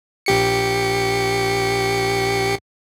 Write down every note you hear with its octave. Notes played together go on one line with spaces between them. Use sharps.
A#1 G4 C#7